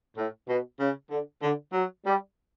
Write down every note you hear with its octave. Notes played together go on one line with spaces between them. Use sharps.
A2
B2
C#3
D3
D3
F#3
G3